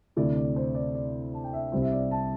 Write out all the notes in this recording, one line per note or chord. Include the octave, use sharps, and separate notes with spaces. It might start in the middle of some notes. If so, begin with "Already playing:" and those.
D2 C3 A3 E4 D5
D5
C5
D5
D5
A5
G5
E5
C2 C3 G3 C4 C5
E5
D5
A5